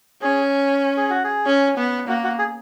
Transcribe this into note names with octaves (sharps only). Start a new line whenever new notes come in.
C#4 G#4
G#4
F#4
G#4
C#4
B3
A#3 F#4
F#4
G#4